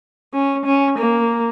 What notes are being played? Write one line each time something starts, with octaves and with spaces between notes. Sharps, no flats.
C#4
C#4
A#3